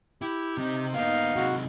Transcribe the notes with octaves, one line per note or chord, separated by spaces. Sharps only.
E4 G4
C3 C4 D#4
A#3 B3 D#4 G4 F5
C3 G#3 F#4